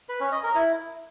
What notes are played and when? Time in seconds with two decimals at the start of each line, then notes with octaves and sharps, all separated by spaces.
0.09 B4
0.20 C#4
0.32 D#5
0.43 A#4
0.55 E4